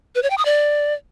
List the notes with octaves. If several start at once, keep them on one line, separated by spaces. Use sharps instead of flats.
B4
C#5
G5
D#6
D5